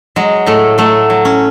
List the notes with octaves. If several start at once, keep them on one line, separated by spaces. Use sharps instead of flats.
F#3 G#3
A2 A3
F#3 A3
F#3
C#4